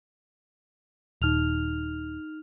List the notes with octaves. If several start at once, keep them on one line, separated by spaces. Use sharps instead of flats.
D#1 D#4 F6 F7